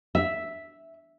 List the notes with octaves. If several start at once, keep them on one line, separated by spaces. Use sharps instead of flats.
E5